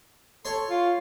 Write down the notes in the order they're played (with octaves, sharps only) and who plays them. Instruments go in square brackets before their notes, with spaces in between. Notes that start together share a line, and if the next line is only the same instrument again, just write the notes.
[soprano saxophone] A4 [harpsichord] C#5 C6
[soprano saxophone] F4